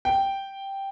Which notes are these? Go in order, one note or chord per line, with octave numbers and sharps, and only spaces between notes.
G5